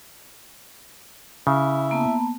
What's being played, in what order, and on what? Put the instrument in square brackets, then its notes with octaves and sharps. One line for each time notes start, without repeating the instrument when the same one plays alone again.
[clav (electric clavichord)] C#3 [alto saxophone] E4
[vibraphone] A#3 B3 A5